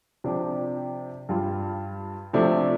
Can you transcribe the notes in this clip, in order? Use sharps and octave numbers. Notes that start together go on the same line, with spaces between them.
C3 F3 D4 G4
G2 G3 F4
C3 F3 A3 D4